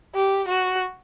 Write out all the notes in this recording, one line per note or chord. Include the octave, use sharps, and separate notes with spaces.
G4
F#4